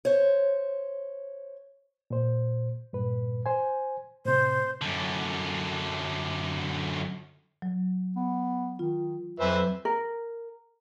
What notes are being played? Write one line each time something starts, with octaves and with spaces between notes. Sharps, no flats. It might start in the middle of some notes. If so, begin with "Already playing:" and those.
C5 C#5
A#2 C5
G2 A#2 B4
C5 G#5
A2 C3 C5
F#2 D3
F#3
B3
D#3 F4
F2 F#3 B4 C5 E5 G#5
A#4